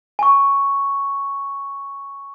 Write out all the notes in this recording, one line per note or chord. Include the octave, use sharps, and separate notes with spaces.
G#5 C#6